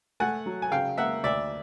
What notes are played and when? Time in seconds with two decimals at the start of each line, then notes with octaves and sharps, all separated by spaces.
0.20 A3 F#5 G#5
0.46 F#3
0.62 G#5
0.71 C#3 F5 G5
0.98 A#3 E5 F#5
1.24 D2 D5 E5